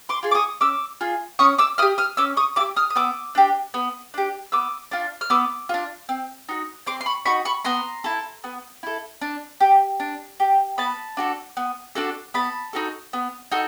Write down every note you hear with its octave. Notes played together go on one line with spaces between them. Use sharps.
C6 D6
F4 G#4
D6
C#6 D#6
C#4 D6 E6
F4 G#4
C#4 C#6 D#6
D6 E6
E4 D#6 F6
G4
D#6 F6
C#4 D6 E6
C#6 D#6
E4 D6 E6
G4
D#6 F6
D#6
B3 D6 E6
D4 G4
B3
D4 G4
B3 D6 E6
D4 F4
F6
B3 D6 E6
D4 F4
C4
D#4 F#4
C4 C6 D6
C6
B5 C#6
D#4 F#4 B5 C#6
B5 C#6
B3 A#5 C6
E4 A4
B3
E4 A4
D4
G4
D4
G4
B3 A5 B5
D4 F#4 A4
B3
D4 F#4 A4
B3 A5 B5
D#4 F#4 A4
B3
D#4 F#4 A4